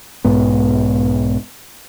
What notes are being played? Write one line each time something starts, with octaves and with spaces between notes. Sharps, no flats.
B1 G#2 B3